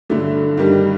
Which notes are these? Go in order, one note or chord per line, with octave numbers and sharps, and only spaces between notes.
G2 D3 F#3 A3 D4
G2 D#3 G3